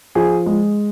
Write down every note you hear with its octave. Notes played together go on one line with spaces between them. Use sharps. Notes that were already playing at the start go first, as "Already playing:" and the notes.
F3 G#4
G#3